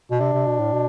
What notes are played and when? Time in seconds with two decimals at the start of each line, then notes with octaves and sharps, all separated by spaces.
0.11 B2
0.20 C3 D4
0.33 C3
0.47 B2
0.59 A2
0.73 B2